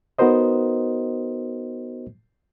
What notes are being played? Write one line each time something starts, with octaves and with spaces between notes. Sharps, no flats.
B3 D#4 F#4 A#4 C5 D#5